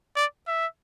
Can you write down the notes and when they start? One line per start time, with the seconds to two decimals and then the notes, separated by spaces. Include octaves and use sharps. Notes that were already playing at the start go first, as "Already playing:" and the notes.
0.16 D5
0.48 E5